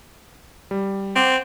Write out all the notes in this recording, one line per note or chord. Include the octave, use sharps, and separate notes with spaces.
G3
C4 C5 F#5 D6